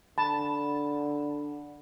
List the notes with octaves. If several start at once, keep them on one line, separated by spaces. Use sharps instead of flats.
D3 A5 B5